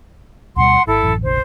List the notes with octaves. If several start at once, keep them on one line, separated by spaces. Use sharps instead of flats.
D2 B2 G3 F#5 C6
G#1 E4 A4
A1 F#2
F1 A#1 D3 C5